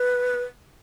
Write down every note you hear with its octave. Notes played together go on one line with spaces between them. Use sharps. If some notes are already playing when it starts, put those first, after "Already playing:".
Already playing: B4